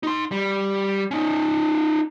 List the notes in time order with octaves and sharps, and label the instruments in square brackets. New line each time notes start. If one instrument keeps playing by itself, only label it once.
[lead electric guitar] D#4 C6
G3
C#4 D#4